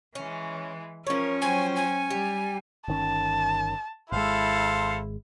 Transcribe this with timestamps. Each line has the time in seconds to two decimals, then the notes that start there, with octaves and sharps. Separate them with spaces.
0.15 E3 G#3 C#4
1.07 F3 C#4 A#4 C#5
1.41 F#3 C5 G5 G#5
1.76 G#5
2.10 G3 G4
2.88 G1 D#3 C#4 A5
4.12 G#1 G#3 E4 A4 C5 F5